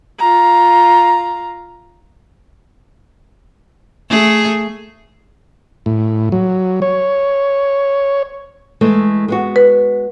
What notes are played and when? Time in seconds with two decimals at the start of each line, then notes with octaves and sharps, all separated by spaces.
0.19 F4 A#5
4.09 A3 G#4
5.86 A2
6.32 F#3
6.82 C#5
8.81 E3 G#3 A3
9.28 G#3 B3 F#4
9.56 B4